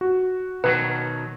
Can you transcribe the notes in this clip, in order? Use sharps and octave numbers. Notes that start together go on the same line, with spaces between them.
F#4
B2 D#3 F#3 B4